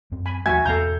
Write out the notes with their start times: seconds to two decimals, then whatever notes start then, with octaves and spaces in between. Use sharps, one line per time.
0.12 F#2 C4
0.26 G#5 B5
0.46 D#2 F3 A3 F#4 E5 G#5 G#6
0.66 B1 E2 B3 A4 F5 A#5 G6